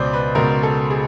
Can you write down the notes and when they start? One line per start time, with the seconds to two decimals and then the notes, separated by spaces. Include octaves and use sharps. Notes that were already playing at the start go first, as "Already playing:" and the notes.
Already playing: C#2 B2 C5 D5
0.13 B4
0.35 C#2 B2 A#4
0.63 A4
0.90 G#4